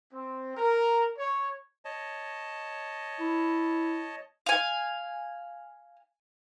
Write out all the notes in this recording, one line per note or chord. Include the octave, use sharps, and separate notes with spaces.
C4
A#4
C#5
C#5 D#5 A5
E4
F5 G#5